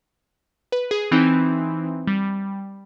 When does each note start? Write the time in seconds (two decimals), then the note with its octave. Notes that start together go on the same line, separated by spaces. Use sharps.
0.72 B4
0.91 G#4
1.11 E3 C4 D#4
2.07 G3